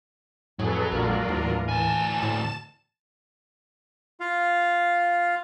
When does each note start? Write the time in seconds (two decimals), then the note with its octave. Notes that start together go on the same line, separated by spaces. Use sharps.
0.59 F2 A2 F#3 G#4 A4 B4
0.91 A#1 A#2 G#3 D4 F4 A#4
1.29 D#2 A2 E3
1.69 D2 G#5 A5 E7
2.23 A2
4.20 F4 F5